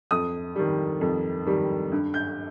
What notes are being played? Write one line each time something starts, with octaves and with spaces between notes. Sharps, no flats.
F2 D#6
D#3 G3
F2
D#3 G3
G2
G6